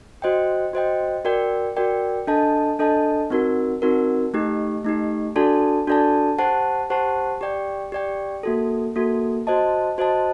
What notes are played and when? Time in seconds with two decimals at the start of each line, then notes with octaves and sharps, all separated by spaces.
0.22 F#4 C5 D#5 G5
0.73 F#4 C5 D#5 G5
1.25 F#4 A#4 D5 G5
1.77 F#4 A#4 D5 G5
2.27 D4 A4 D#5 A5
2.79 D4 A4 D#5 A5
3.30 C4 D#4 F#4 A#4
3.82 C4 D#4 F#4 A#4
4.34 A3 D#4 G4
4.84 A3 D#4 G4
5.36 D4 F#4 A4 D5 A5
5.87 D4 F#4 A4 D5 A5
6.39 G4 C5 F#5 A5
6.90 G4 C5 F#5 A5
7.41 G4 D5 G5
7.92 G4 D5 G5
8.43 A#3 F#4 A4
8.96 A#3 F#4 A4
9.47 F#4 C5 D#5 A5
9.98 F#4 C5 D#5 A5